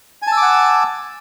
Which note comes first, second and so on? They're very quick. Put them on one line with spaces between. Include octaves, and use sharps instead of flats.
G#5 A5 E6 D6 F#5